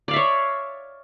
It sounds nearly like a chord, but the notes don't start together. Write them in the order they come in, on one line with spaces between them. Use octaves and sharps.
D5 F5 E5 C#5